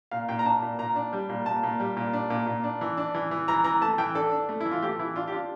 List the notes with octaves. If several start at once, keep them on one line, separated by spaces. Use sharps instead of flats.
A#2 F5
A#2 G5
A#5
D4 A5
A#2
A#2 A#5
D4
G3
A#2
A#2 A5
A#2
G3
A#2
D4
A#2
A#2
D4
E3
D4
E3
E3
E3 A#5
E3 A#5
A3 A5
E3 G5
D4 A4
D4
A3
E3 E4
F4
A3 G4
E3 E4
D4 F4
G4
D4 F4